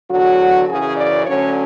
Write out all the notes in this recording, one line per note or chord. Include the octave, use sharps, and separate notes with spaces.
E2 D3 F#3 F#4
F#2 C#3 E3 G#4
D5
D2 D3 F#3 C#4 C#5